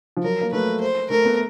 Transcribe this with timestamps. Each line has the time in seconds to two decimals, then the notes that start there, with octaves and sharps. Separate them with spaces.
0.17 F3
0.23 F#3 A#4
0.41 A#3
0.52 A3 B4
0.81 C5
1.10 A3 A#4
1.25 B3